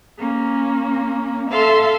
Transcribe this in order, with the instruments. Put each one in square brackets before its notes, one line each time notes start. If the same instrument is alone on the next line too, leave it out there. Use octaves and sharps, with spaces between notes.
[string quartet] A#3 C#4
A4 E5 F5 C6